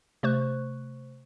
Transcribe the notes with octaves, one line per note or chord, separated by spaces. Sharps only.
C3 A3 C5 C#6 F#6